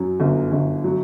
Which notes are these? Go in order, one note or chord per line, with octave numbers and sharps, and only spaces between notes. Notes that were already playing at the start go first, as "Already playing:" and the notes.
Already playing: F#2 F#3
G1
G1
F#3